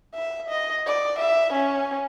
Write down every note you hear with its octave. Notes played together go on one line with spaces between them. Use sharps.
E5
D#5
D5
E5
C#4